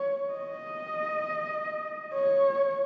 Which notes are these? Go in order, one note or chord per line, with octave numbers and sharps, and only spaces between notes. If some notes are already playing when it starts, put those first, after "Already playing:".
Already playing: C#5
D#5
C#5